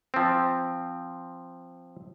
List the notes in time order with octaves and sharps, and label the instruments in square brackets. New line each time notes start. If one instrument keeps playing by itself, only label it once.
[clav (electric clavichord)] F3 C4